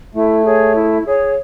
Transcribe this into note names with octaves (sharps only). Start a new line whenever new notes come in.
A3 E4
G#4 C#5
E4
G#4 C#5